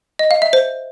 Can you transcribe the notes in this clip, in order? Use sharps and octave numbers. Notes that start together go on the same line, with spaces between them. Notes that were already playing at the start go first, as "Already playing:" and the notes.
D#5
F5
E5
C5